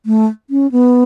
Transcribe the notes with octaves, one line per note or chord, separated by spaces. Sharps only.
A3
C#4
B3